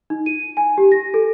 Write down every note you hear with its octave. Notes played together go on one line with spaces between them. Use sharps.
D#4
D#7
G#5
G4
A#6
A4